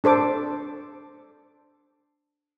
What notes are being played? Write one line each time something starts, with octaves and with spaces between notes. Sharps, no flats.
D4 A4 C5 D6